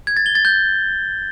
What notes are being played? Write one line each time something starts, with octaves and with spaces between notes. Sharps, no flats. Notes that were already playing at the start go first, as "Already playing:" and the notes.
G#6
A6
G7
A6
G6